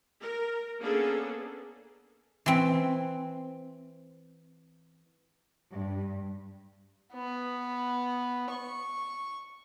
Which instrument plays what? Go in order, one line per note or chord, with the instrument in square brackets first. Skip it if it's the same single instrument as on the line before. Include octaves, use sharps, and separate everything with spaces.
[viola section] A#4
A#3 B3 C#4 D4 G#4 A4
[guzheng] E3 C4
[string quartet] G2
[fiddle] B3
C#6